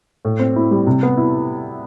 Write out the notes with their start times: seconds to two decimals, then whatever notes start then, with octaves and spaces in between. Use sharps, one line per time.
0.25 A2
0.39 C4
0.56 E4
0.71 G3
0.87 C3
1.03 B3
1.18 E4